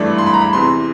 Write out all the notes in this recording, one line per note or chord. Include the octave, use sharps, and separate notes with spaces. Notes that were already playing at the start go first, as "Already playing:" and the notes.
Already playing: G#1 G2 E3 A3 D4
C6
B5
A#5
B5
E2 C3 E3 C6